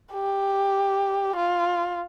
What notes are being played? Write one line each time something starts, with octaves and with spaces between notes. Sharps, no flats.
G4
F4